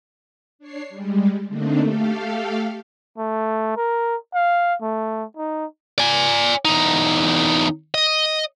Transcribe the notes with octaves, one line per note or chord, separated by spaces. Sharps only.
D4 C#5 C7
G3 G#3
D3 A3 A#3 C4 D4 D#4
A3 G4 A4 F5
A3
A#4
F5
A3
D#4
D5 G#5
E2 D#4
D#5